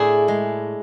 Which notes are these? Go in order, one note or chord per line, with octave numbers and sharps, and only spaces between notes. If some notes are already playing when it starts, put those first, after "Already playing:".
Already playing: A2 D4 E4 G#4
G#3